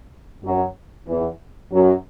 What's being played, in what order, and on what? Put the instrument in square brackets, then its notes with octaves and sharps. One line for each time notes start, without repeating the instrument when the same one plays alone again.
[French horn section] F#2 F#3
E2 E3
F#2 F#3